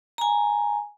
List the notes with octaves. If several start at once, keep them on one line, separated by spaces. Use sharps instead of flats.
G#5 A#5